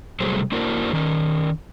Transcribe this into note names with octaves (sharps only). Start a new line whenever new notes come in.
C3 F#3 G3 A3 G#4 C5
A#3 D4 E4 F#4 A#4 C5
D#3 C#4 A#4